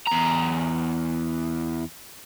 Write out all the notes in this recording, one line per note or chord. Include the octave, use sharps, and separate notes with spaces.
E2 A#5